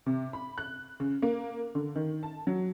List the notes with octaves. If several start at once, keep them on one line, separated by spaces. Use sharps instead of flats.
C3
B5
F#6
C#3
A#3
D3
D#3
A5
F#3